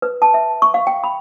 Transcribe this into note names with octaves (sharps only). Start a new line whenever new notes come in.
B4
A5
E5
C#6
F5
G5
B5